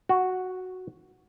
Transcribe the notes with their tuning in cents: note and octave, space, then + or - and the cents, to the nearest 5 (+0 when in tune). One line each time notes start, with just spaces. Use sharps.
F#4 +0